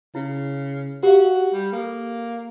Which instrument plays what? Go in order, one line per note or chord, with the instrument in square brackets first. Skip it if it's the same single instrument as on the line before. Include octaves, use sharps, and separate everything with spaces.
[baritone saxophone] C#3 [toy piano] E4
[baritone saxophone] F#4 [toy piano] G4 F5
[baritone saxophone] G3
[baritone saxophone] A#3 [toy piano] A4